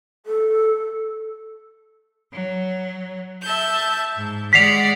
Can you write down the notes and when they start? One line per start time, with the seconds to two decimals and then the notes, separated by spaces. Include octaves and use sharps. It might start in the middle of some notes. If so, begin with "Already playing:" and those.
0.26 A4
2.33 F#3
3.42 E5 A5 G6
4.16 G#2
4.53 G#3 D5 F#5 B6 C7 F7